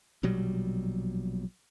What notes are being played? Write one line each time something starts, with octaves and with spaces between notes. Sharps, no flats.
A#1 B2 F#3 G3